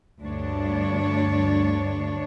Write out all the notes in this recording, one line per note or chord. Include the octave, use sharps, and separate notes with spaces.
D2 G2 D4 C#5